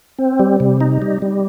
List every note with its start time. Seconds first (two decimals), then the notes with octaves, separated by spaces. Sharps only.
0.19 C4
0.39 G3
0.60 C3
0.80 D#4
1.02 G3
1.22 G3